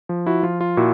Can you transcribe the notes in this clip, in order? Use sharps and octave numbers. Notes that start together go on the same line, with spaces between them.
F3
E4 F#4
F3 F4
F4
A#2 E4 F#4